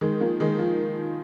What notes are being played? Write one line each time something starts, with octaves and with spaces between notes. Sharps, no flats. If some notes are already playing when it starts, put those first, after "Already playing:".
D#3 G#3
F3 A#3
D#3 G#3
F3